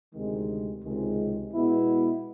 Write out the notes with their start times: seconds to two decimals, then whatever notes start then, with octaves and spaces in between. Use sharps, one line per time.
0.13 D2 C3 D#3 G#3
0.83 C#2 C3 D#3 G#3
1.52 B2 G#3 B3 E4